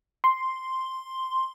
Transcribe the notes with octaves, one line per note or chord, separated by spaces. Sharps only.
C6